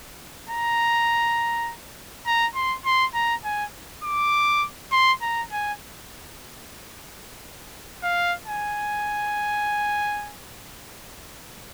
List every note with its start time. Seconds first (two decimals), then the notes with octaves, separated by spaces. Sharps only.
0.49 A#5
2.26 A#5
2.55 C6
2.85 C6
3.14 A#5
3.44 G#5
4.04 D6
4.92 C6
5.22 A#5
5.52 G#5
8.03 F5
8.47 G#5